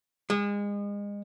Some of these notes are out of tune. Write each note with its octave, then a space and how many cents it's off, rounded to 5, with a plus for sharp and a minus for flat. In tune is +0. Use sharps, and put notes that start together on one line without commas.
G#3 -30